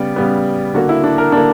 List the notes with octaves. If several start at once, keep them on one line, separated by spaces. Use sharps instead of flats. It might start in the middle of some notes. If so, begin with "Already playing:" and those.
Already playing: C#3 G3 B3 D5
C#3 G3 B3
D3 A#3 F#4
E4
D4
A#4
D3 A#3 D4